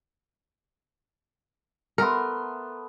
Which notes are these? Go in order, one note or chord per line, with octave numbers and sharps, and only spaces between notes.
A3 B3 A#4 C6